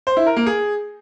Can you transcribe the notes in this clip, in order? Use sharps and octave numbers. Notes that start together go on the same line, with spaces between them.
C5
E4
A#4
A#3
G#4